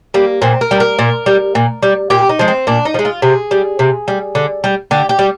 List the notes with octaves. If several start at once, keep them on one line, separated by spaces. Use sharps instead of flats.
G3 A#3
A#2 C4
A#4
G3
A#4
A#2
G3
A#2
G3
A#2 G4
D#4
F3 G#3
C4
A#2 D4
D#4
F3
G#3
F4
C3 G#4
G3
C3
G3
D3
G3
D3 G4
G4
G3